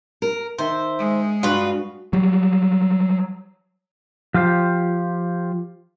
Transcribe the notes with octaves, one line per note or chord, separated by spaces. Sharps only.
A#4
D#3 C5 E5
G#3
G2 F4 F#4 B4
F#3 G3
F3 F4 G4 C5